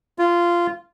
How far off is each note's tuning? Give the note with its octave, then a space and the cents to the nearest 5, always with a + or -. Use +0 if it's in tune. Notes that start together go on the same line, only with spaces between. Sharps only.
F4 -15